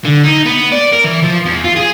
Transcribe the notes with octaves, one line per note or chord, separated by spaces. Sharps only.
D3
D#4
B3
D5
A#4
E3
F3
E2
F4
G#4